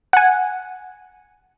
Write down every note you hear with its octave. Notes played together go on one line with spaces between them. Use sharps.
F#5 G#5